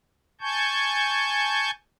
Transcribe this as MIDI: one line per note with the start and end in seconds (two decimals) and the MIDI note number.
0.41 1.71 80
0.41 1.71 81
0.41 1.71 85
0.41 1.71 91